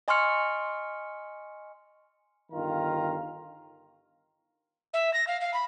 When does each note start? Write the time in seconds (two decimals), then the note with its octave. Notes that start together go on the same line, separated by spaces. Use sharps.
0.08 D#5 G#5 C6 C#6 F6 C#7
2.52 G1 D#3 F4 F5 A#5
4.93 E5
5.13 A#6
5.27 F5
5.41 F5
5.53 B5